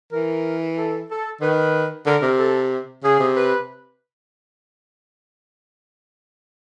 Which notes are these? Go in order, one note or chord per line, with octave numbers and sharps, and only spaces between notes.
E3 A#4
A4
A4
D#3 B4
D3 A#4
C3
A4
C#3 G#4
C3
B4